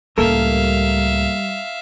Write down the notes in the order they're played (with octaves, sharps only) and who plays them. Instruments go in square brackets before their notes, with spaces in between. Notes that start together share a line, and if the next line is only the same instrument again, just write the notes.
[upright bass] C#2 A2 [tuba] G3 [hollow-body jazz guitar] A#3 A4 A#4 [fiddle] E5 F5